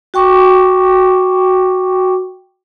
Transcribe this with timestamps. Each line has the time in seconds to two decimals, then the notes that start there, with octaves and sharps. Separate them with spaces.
0.14 F#4 G5 C#6 D6